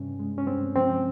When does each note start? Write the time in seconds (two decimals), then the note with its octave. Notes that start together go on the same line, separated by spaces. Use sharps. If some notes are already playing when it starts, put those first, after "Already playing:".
Already playing: G2 C3 C#4
0.19 G#3
0.38 C#4
0.47 G2 C4
0.75 F3 C4